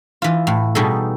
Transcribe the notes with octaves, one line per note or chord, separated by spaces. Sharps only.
E3 F4
A2
B2 G3 D#4 G#4 A4